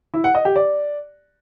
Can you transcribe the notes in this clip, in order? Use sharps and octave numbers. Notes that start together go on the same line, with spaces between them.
E4
F#5
D#5
G4
D5